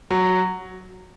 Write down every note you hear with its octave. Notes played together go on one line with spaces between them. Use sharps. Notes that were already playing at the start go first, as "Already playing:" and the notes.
F#3